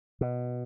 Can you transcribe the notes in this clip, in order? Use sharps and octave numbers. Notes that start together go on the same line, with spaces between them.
B2